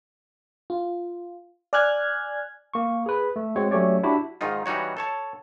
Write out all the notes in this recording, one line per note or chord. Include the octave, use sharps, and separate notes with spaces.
F4
D5 G#5 F6 F#6 G#6
A#3 C#6
G#4 B4
A3
G#3 C4 F#4 C#5
F#3 A3 C#4 G4 C#5 D5
D4 E4 F#4 G4
G#2 D#3 D#4 F4
E3 G3 D#4 F#4 C#5
A4 C#5 A5